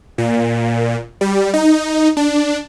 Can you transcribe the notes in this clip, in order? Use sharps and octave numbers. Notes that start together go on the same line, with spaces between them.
A#2
G3
D#4
D4